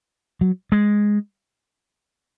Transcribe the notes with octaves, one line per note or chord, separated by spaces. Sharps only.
F#3
G#3